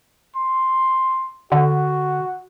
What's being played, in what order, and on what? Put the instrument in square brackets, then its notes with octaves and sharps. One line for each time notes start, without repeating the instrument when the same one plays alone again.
[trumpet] C6
[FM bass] D3 [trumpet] F#4